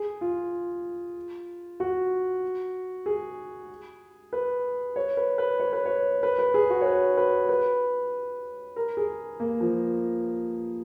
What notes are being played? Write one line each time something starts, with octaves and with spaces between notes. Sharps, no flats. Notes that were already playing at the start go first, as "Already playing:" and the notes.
Already playing: G#4
F4
F#4
G#4
B4
C#5
B4
B4
C#5
B4
C#5
B4
B4
G#4
F#4
C#5
B4
B4
B4
A#4
G#4
A#3
F3